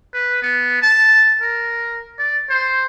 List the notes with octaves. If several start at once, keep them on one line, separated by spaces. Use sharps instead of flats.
B4
B3
A5
A#4
D5
C5